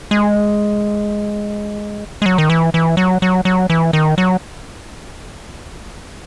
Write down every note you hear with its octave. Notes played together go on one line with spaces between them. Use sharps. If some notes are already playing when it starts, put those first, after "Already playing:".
G#3
G#3
F#3
D#3
E3
E3
F#3
F#3
F#3
E3
D#3
F#3